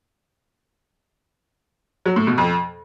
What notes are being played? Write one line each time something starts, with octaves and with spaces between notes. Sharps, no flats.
F#3
A2
B2
F2